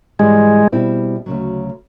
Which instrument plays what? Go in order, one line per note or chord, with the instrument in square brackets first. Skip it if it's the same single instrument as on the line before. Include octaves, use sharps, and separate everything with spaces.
[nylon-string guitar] G#2 E3 G3 [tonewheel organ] G#3
[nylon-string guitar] B2 G3 C4 E4
D2 C#3 F#3